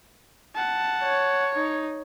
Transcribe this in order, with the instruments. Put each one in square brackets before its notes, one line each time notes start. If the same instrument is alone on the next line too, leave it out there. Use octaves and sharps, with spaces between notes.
[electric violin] F#5 A5
[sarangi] C#5
[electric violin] D#4